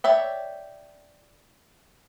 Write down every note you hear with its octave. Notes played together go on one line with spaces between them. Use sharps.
C#5 D5 E5 G5